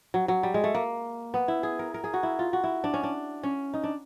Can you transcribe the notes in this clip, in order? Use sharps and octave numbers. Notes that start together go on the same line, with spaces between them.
F#3
F#3
G3
G#3
A3
A#3
B3
E4
G#4
A#4
A#4
G#4
F#4
E4
F4
F#4
E4
D4
C#4
D4
C#4
D#4
D4